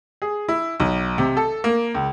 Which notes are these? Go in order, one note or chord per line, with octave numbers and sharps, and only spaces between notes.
G#4
E4
B1
C3
A4
A#3
C#2